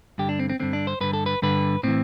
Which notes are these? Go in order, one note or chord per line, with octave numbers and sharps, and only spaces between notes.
G2 D3 G4
D4
C4
C4
G2 D3 C4
D4
C5
G2 D3 B4
A4
B4
G2 D3 B4
A2 E3 C4